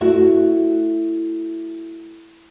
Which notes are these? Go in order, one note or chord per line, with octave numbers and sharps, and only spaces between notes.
A3 E4 F#4